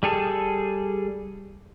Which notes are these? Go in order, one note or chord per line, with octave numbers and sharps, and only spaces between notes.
G3 G#4 A4